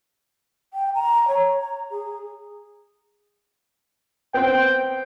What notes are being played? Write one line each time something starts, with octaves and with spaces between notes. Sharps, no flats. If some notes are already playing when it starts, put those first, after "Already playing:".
G5
A#5
C#5
A#5
G#4
B3 C4 G5